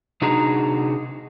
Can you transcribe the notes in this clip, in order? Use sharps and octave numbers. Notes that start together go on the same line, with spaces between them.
C3 D4 D#4 F#4 G#4 A#5